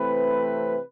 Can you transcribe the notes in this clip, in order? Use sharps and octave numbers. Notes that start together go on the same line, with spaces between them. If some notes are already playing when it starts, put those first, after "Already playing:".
Already playing: C3 E3 A3 C4 B4